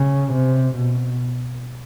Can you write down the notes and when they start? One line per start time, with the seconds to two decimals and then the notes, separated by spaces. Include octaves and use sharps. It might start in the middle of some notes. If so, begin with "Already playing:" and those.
Already playing: C#3
0.32 C3
0.76 B2